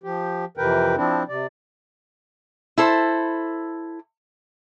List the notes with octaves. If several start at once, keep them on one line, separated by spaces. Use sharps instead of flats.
F3 G4
F2 C3 E3 A#4 B4 G5
F3 C4 D4 E4
C3 D5
E4 A4 C5